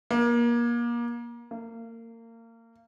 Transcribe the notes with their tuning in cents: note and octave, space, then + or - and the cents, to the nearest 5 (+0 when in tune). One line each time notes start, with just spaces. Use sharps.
A#3 +30
A#3 -30